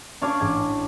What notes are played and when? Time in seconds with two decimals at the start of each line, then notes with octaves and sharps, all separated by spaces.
0.22 C#4 D4 C#5 D5 F5 A5
0.40 A1 G#2 G#6